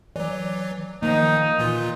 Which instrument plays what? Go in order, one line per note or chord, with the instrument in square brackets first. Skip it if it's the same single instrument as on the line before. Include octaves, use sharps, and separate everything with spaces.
[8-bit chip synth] E3 F#3 [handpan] D5
[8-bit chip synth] D#3 F3 [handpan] A#3 [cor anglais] D#4
[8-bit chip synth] A#2 E3 F4